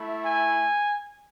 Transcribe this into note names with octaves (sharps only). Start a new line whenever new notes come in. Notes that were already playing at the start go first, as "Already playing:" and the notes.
Already playing: A3 E4
G#5